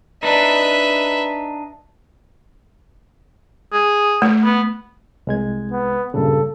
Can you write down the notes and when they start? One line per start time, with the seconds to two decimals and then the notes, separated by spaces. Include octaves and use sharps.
0.23 D4 D#4 B4 E5
3.73 G#4
4.22 A3
4.44 B3
5.27 C2 G#3 G#6
5.72 B3
6.14 G2 A#2 C#3 A4